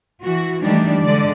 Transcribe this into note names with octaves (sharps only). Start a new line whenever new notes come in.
E3 F#4
D#3 E3 G3 A3 D4 D#4
D3 G#3 D5